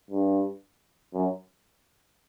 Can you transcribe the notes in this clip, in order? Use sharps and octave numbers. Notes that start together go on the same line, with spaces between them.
G2
F#2